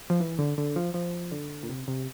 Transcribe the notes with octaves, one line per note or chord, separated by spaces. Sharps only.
F3
E3
D3
D3
F3
F3
D3
A#2
C3
C3